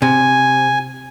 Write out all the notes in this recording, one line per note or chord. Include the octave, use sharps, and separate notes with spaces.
C3 G#5